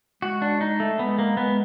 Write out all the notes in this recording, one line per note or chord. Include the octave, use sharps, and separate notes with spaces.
G#3 F#4
D4
D#4
A3
G#3 B3
A#3
G#3 B3